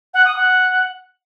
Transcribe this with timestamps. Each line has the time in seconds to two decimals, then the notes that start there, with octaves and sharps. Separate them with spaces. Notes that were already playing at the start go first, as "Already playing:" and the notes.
0.14 F#5
0.25 D#6
0.37 F#5